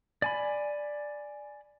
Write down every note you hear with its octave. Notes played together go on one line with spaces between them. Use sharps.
D5 G#5 B5